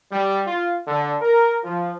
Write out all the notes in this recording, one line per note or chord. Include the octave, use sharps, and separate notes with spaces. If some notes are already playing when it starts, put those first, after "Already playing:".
G3
F4
D3
A#4
F3